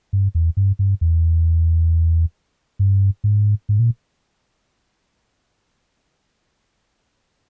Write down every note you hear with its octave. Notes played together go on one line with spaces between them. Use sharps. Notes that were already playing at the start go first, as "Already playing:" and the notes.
G2
E2
G2
G2
E2
G2
G#2
G#2
A#2